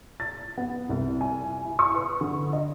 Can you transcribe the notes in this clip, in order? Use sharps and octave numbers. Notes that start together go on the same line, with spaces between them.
A6
B3
C2
G#5
E4
C#6
B4
D3
D#5